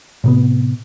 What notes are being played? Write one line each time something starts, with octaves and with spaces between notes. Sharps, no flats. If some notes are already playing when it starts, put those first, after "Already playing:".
A2 C3 B3